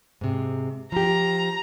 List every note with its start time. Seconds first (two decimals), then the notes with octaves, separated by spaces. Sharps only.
0.21 G#2 C3
0.92 F3 G4 A#5